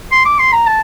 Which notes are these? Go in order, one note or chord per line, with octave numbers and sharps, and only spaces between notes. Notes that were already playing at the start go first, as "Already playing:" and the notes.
C6
D6
C6
A#5
A5